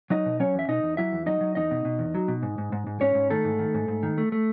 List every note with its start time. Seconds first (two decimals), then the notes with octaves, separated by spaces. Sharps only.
0.10 F#3 D#4 D#5
0.26 B2
0.40 F#3 C#4 C#5
0.54 E2 E5
0.68 B2 D#4 D#5
0.83 E2
0.97 F#3 E4 E5
1.12 E2
1.26 F#3 D#4 D#5
1.41 F#3
1.55 E2 D#4 D#5
1.71 B2
1.85 B2
1.99 E2
2.15 F#3
2.28 B2
2.43 G#2
2.58 G#2
2.72 G#2
2.87 G#2
3.01 G#2 C#4 C#5
3.15 G#2
3.30 D#3 A3 A4
3.44 G#2
3.59 D#3
3.74 G#2
3.88 G#2
4.03 D#3
4.18 A3
4.32 A3